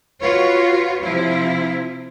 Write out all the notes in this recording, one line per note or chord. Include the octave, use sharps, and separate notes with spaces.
F4 F#4 B4 C#5
C3 F3 E4 F4